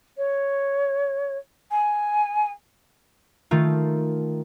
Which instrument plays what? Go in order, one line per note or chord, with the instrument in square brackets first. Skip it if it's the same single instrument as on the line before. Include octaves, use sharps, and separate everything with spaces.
[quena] C#5
G#5
[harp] D#3 A3 F4